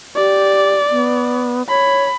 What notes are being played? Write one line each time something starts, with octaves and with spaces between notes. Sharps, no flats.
G4 D5
B3
C#5 B5